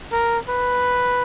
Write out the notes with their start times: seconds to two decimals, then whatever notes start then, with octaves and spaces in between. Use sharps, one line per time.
0.12 A#4
0.49 B4